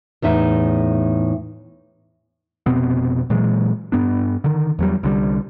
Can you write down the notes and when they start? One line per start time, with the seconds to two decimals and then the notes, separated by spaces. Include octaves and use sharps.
0.22 E2 A2 D#4 E5
2.66 F1 B2 B3 C4
3.30 A#2 E3 F#3 G#3
3.92 G2 B3 D4
4.44 D3 D#3
4.79 E2 F#3 G3
5.03 C2 D3 E3 G3